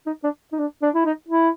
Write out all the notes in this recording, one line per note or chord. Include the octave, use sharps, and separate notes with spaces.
D#4
D4
D#4
D4
D4
E4
D#4
E4